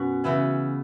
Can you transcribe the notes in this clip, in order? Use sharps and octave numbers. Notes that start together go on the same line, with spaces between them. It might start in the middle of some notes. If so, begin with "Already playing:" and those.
Already playing: F#2 B2 C#4 F#4
C#3 E3 B3 E4